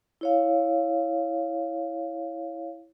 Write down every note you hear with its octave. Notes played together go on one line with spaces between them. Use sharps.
E4 C#5 F5